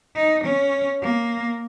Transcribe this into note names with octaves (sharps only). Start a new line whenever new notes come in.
D#4
C#4
A#3